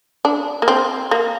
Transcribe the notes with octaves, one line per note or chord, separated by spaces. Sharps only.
D4
A#3
C4
A#3